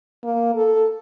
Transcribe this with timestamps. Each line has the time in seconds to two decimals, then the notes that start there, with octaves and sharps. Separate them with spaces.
0.23 A#3
0.55 A4